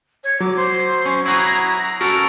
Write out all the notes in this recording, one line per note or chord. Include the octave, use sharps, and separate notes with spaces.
C#5
F#3 D6
C5
C#4
E4 F#4 G#4 A#5
C#4 F#4 A4 A#4